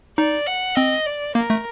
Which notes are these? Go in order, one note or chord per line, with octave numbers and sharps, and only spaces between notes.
D#4 D5
F#5
C4 D#5
D5
A#3 A#4
A3